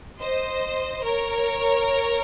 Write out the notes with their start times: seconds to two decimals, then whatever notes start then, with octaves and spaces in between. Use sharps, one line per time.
0.21 C5 D#5
1.04 A#4 C#5